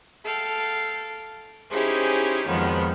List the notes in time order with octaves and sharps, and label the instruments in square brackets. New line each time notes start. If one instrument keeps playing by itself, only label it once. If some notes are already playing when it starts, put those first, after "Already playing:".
[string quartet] A4 F5 G5
C#4 D#4 E4 G4 G#4 C5
F2 D#3 F3 F#3 G#3 B3